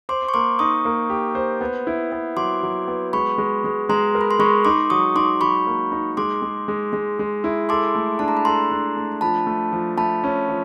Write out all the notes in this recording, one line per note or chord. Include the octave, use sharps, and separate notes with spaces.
C5 C6 D6
C#6
A#3 C6 D6
D#4 C#6 D#6
A#3
G4
C5
B3
E4
B3
F#3 C6 D6
F#3
B3
G#3 B5 C#6
G#3
G#3
G#3 A#5 C6
A#4
B5
C6
G#3 B5 C#6
D#4 C6 D6
F#3 C#6 D#6
D#4 C6 D6
F#3 B5 C#6
A#3
D#4
G#3 C6 D6
G#3
G#3
G#3
G#3
E4
A4 C6 D6
A3
D4 A5
A#5
B5
A4 A#5 C6
D4
A3
F3 A5 B5
A3
F3
A3 A5 B5
C#4
F3